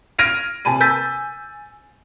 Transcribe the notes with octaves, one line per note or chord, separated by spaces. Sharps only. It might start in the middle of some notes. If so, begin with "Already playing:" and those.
F6 G#6 A#6 D7 D#7 F7
C3 G#5 A5 B5 D#7
G#5 E6 G6 A6 B6